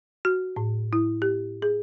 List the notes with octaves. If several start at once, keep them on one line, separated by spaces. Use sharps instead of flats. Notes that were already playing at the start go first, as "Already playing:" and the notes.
F#4
A2
E4
G4
G#4